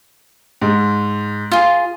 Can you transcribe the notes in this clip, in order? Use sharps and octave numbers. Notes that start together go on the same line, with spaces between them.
G#2
F4 G#4